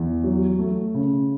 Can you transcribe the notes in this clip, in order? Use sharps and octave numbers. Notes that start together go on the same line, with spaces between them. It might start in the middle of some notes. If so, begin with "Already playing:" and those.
Already playing: E2
F#3
A3
C#3